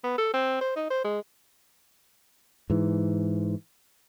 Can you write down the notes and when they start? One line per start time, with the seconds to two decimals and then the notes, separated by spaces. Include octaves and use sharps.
0.04 B3
0.18 A4
0.34 C4
0.61 C5
0.76 D#4
0.90 C5
1.04 G#3
2.70 G#2 E3